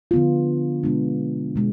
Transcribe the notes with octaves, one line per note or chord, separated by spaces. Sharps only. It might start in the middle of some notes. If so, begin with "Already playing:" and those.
D3 F3 B3 F4
B2 G#3 B3 D4
B2 G#3